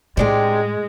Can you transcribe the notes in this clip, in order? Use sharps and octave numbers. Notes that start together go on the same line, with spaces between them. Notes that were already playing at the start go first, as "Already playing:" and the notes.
A2 C3 G#3 D4 G4